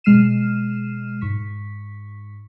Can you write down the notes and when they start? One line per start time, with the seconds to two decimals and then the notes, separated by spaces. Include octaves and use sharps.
0.04 B2 G#3 F6 C7 D#7 E7
1.21 G#2 C#6 B6